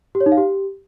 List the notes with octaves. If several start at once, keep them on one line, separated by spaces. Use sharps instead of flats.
G4
C#5
D#4
F5
G4